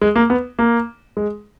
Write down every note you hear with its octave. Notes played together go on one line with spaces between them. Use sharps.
G#3
A#3
B3
A#3
G#3